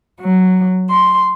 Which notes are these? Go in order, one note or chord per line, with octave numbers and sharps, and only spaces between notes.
F#3
C6